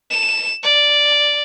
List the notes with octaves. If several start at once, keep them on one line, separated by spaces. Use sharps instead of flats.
E7
D5